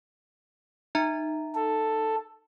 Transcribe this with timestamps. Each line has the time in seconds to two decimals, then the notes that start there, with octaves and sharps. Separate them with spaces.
0.95 D#4 E5 A#5
1.55 A4